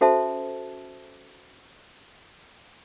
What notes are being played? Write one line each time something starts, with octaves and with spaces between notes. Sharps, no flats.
C#4 F#4 A4 C5 E5 A5